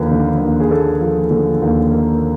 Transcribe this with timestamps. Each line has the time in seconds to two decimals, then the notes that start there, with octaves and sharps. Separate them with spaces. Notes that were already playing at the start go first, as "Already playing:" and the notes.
Already playing: D#2 D3 F3 A#3 B4
0.11 D3
0.41 D#2
0.60 G#4
0.70 A#3 A4
1.01 F3
1.31 D3
1.62 D#2
1.91 A#3